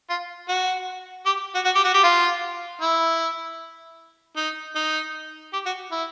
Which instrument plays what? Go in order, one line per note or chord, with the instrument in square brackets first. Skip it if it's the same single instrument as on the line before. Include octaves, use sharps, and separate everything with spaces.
[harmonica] F4
F#4
G4
F#4
F#4
G4
F#4
G4
F4
E4
D#4
D#4
G4
F#4
E4